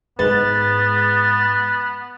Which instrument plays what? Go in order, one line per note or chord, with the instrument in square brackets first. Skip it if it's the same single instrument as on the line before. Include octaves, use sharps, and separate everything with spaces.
[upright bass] G#2 [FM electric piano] G#3 B4 [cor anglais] B3 [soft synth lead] A6